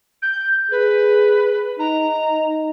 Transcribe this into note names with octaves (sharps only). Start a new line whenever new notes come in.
G6
G#4 B4
D#4 A#5